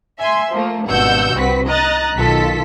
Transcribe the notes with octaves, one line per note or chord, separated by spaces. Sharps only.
E5 G#5 C6
F3 A3 A#3
G#1 G2 B2 F#5 E6 G6
C2 C4 F#4 B4 B6
D#5 A#5 F#6 A6
B1 D#3 F4 A4 B6